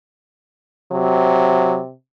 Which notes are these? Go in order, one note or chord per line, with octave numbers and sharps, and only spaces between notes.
C3 F#3